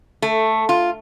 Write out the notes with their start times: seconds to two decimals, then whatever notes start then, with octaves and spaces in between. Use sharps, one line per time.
0.22 A3
0.69 F4